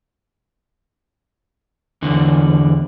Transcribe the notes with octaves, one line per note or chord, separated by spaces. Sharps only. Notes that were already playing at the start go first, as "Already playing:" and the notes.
E2 D3